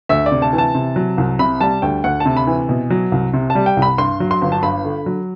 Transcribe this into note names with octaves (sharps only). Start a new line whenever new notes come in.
D2 E5
D5
C3
A5
E3
A5
C3
F#3
C2
C3 B5
G3 A5
D2 G5
D2 F#5
A5
C3
B5
E3
B2
F#3
C2
C3
A5
G3
G5
C2
B5
G2 C6
F#3
C6
G1
A5
G2 B5
D3
F#3